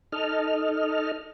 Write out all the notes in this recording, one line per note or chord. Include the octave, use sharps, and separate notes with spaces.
D#4 A4 D#5 F6